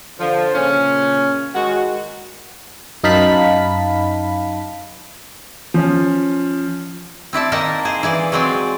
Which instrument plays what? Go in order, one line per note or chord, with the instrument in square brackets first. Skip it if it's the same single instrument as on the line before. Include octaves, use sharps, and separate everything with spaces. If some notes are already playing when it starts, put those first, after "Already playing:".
[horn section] D3 F3
A#2 C#3 C#4
D#3 G#3 F#4
[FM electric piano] F#2 D#4 F5 A5 B5 B6
[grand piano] F3 C#4
[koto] C4 E4 D5 A5
D#3 A#3 D#4 A#4 A5 A#5
G#4 C5
E3 G#4 D5
F#3 G#3 C4 G#4 D5